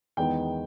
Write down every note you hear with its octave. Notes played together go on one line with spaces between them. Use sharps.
E2 D#3 G#3 B3 D#4 G5